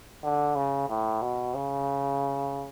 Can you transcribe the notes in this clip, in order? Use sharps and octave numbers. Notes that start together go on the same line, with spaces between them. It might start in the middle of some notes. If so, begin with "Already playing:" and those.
D3
C#3
A2
B2
C#3